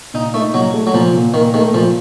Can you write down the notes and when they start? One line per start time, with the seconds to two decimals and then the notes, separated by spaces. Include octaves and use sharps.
0.14 A#2 D#4
0.34 A3 D#4
0.54 A#2 F#3
0.74 A3
0.87 F#3
0.94 A#2 F3
1.14 A#2
1.34 A#2 D#3
1.54 D#3 A3
1.74 A#2 F3